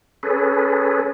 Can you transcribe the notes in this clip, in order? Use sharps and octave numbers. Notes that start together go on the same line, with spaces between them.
C#4 G#4 A4 B4